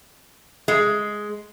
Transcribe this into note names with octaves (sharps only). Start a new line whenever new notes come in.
G#3